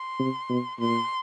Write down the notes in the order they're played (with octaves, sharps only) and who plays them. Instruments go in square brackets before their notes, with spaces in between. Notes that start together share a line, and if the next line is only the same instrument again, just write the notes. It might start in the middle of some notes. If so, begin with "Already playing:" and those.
Already playing: [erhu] C6
[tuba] C3
B2
[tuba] A#2 [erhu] C6